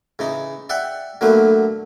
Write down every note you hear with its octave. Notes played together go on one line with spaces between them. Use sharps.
C#3 E3 D#4
D5 E5 F#5 G5
D3 F#3 A3 A#3 B4